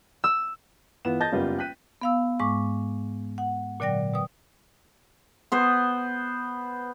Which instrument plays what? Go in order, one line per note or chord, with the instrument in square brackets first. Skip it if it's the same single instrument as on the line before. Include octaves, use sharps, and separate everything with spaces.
[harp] E6
[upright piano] E3 B3 F4 E7
D#5 A5 G6 A6 A#6
F#1 G3 B3 F4 B4
G5 F#6 G6 B6 D#7
[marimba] B3 F5 E6
G#2 G#3 C#6 D6
F#5
A#2 D3 F#3 D5 G5 A#6
B2 G5 D#6
[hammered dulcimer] B3 C5